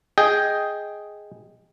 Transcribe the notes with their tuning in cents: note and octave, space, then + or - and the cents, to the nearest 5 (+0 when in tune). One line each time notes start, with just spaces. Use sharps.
G#4 +0 D#5 +10 G5 +0